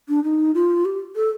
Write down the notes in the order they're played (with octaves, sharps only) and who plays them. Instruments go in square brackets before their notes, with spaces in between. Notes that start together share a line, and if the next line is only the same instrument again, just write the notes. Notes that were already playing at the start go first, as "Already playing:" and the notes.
[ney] D4
D#4
F4
G4
A4